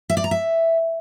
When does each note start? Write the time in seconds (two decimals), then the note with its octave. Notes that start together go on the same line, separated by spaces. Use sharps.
0.10 E5
0.17 D5
0.24 A#5
0.31 E5